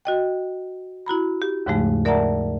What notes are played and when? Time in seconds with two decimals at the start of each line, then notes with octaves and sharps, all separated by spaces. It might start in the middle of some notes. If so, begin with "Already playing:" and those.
0.05 F#4 D#5 G5
1.06 E4 F#4 A#5 B5
1.42 G4
1.66 D#2 G#2 C#3 F3 G#3 A3
2.05 A#4 D5 E5 F#5 A5 A#5